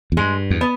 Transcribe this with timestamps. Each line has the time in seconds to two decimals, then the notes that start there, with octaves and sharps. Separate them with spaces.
0.12 E2
0.17 G2 G#3
0.51 E2
0.61 B3